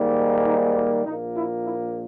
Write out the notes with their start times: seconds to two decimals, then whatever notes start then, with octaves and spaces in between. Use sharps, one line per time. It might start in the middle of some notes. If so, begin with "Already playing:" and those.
Already playing: G#2 D#3 G3 A#3
0.46 D#4
0.76 D#4
1.05 A#1 A#2 A#3 D#4
1.35 E4
1.64 E4